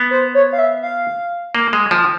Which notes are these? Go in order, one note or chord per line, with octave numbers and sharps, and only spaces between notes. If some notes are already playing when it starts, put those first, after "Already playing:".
Already playing: B3
C5
C#5
F5
E5
F5
A#3
G#3
F3